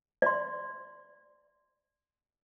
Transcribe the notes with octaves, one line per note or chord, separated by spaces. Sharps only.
D5 C6